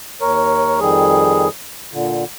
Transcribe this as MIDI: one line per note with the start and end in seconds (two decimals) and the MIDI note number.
0.21 0.80 39
0.21 0.80 70
0.21 0.80 73
0.80 1.48 41
0.80 1.48 51
0.80 1.48 55
0.80 1.48 68
1.93 2.24 46
1.93 2.24 50